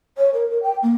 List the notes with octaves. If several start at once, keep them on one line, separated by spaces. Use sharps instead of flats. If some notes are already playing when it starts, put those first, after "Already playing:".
C#5
A#4
A#4
G5
A#3